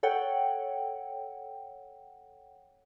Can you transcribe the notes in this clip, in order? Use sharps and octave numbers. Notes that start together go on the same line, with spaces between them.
A4 C#5 F#5 G5